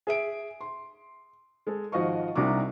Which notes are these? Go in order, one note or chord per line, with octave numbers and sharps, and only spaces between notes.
G#4 E5 D7
C6
G#3 A4
G#1 F3 F#4 D#5 F5 C#6
C2 C3 D4 D#4 F#4 D6